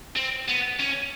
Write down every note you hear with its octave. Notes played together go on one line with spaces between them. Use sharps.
C4
B3
C#4